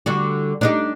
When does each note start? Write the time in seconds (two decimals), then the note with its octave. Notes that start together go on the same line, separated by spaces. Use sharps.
0.06 D3 G3 F#4
0.61 D4 D#4 G4